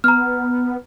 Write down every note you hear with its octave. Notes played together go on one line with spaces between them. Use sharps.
B3 A#5 F6